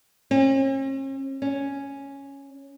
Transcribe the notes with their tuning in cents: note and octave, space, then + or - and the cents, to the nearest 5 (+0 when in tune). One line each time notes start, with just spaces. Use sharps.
C#4 -45
C#4 +0